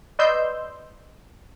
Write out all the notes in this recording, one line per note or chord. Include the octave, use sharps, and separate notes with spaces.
B4 D5 D#5 C6 E6 G6